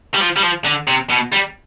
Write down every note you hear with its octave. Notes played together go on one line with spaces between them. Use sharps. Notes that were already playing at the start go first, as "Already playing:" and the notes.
G3
F3
G3
F3
D3
C3
B2
G3